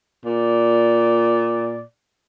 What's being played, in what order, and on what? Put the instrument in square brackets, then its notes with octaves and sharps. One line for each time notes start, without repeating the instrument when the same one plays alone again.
[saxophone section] A#2 D5